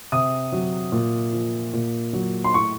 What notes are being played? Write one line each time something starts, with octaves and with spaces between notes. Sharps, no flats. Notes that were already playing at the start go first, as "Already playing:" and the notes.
C3 D#6
F#3
A#2
F3
A#2
F#3
C6
A2 C#6